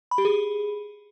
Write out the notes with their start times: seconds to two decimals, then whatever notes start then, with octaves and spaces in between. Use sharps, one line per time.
0.11 B5
0.18 G4
0.25 G#4